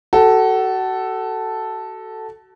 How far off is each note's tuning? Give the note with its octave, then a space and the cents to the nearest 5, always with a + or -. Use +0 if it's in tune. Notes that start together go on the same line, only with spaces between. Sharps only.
F#4 +30 A4 +0